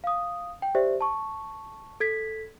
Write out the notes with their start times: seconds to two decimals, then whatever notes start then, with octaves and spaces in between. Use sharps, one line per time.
0.04 F5 D#6
0.62 G5
0.75 G4 C5 D5 E5
1.01 A5 C#6
2.00 A4 G#6 B6